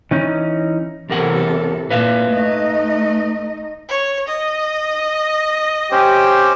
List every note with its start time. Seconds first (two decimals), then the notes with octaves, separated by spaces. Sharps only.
0.11 E3 C#4 D#4
1.10 E2 C3 E3 A4 A#4 F#5
1.91 A#2 B4 E5 F5
2.32 A3 D#4 D#5
3.89 C#5
4.28 D#5
5.92 C#4 G4 C5